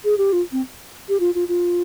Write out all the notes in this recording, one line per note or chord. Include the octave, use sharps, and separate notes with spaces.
G#4
G4
F4
C4
G4
F4
F4
F4